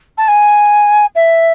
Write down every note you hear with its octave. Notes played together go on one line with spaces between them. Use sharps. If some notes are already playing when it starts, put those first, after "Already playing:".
A5
G#5
E5